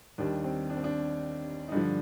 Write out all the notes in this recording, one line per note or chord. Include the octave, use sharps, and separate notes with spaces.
D#2 D#3 G3 D4
C4
D4
C4
D4
D#4
G2 D3 F3 D4